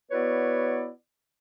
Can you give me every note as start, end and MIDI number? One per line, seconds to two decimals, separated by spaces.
0.11 0.88 59
0.11 0.88 64
0.11 0.88 66
0.11 0.88 71
0.11 0.88 73
0.11 0.88 74